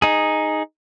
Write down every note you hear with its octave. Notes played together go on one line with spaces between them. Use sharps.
D#4 G#4